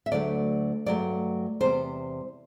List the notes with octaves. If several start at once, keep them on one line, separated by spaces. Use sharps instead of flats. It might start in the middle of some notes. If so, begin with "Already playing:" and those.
E5
D2 D3 F#3 A3 D5
G2 F#3 A3 D5
E2 C3 G3 C5